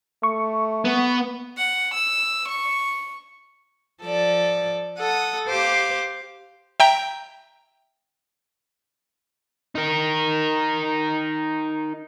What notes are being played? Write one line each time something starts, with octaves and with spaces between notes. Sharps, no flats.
A3 C#6
B3
F#5
E6
C#6
F3 A4 D5
A4 F#5 D#6
G4 C5 F5 D6
E5 G5 A#5
D#4 A#4